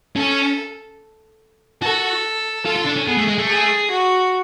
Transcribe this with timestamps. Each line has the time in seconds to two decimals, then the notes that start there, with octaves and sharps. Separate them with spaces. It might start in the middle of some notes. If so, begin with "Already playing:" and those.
0.16 C#4 A4
1.82 F#4 A4
2.65 F4 A4
2.76 F4
2.86 D4
2.96 C#4
3.07 B3 G#4
3.18 A3
3.28 G#3
3.38 A3
3.49 G#4
3.91 F#4